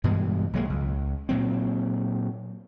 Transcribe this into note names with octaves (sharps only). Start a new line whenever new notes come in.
G2 B2 E3 G#3
B1 F#3 G#3 A#3
C#2
A#2 F#3 C4